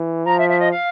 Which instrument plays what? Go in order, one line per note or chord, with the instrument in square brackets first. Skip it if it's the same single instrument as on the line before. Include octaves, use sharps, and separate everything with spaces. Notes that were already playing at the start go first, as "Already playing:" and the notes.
Already playing: [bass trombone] E3
[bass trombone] F3 [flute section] A#5
[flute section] E5
E5
D#5
F5